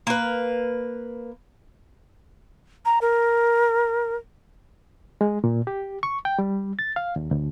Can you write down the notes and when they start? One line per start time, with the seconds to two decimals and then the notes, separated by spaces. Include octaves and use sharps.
0.07 A#3 B4
2.85 A#5
3.01 A#4
5.21 G#3
5.44 A#2
5.67 G4
6.03 C#6
6.25 G5
6.39 G3
6.79 A6
6.96 F5
7.16 D#2
7.31 D2